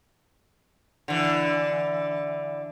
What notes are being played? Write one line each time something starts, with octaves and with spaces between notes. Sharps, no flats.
D3 E3